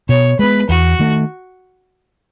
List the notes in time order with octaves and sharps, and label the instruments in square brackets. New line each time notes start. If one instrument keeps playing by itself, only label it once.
[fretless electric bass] B2 [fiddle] C#5
[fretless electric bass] G#3 B3 [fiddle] B4
[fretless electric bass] E2 [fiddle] F#4
[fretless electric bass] D#3 A3